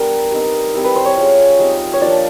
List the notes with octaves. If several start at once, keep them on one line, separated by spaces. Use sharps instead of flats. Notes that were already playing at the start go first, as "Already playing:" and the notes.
Already playing: G3 B3 D4 A#4
G3 C4 D#4
G3 C4 E4
B4
C5
C#5
G#3 C#4 F4
G3 C4 D#4
C#5
F3 A#3 D4 F4 D5